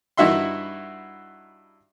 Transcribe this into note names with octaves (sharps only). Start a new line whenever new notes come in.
G2 D#4 E4 F#4 E5 C6